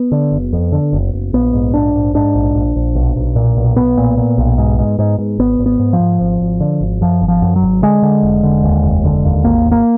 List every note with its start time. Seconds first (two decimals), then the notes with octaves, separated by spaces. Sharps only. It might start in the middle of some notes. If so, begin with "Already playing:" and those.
Already playing: B3
0.12 D3
0.32 F#1
0.53 F2
0.72 D3
0.93 F#1
1.13 F#1
1.33 A#1 B3
1.53 G#2
1.74 A#1 D4
1.94 G#2
2.14 G#2 D4
2.35 A#1
2.55 A#1
2.76 A#1
2.95 B1
3.16 B1
3.36 A#2
3.57 B1
3.76 B1 B3
3.97 A#2
4.17 A#2
4.38 B1
4.58 G#2
4.79 G#2
4.99 G#2
5.18 G#2
5.38 G#1 B3
5.59 G#1
5.66 B3
5.79 G#2
5.93 F3
6.00 G#2
6.21 G#1
6.41 G#1
6.60 D3
6.81 G#1
7.01 F#2 F3
7.22 G#1
7.28 F3
7.42 F#2
7.56 F#3
7.62 G#1
7.82 D3 G#3
8.03 D3
8.23 F1
8.43 D3
8.63 D#2
8.84 F1
9.04 D3
9.25 D#2
9.44 G#1 A#3
9.65 G#1
9.71 A#3